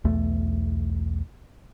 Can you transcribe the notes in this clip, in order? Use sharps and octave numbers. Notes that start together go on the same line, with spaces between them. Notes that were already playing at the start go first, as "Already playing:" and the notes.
B1 E2 A3